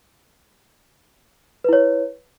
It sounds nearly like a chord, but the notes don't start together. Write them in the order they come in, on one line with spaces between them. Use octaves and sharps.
B4 E4 C#5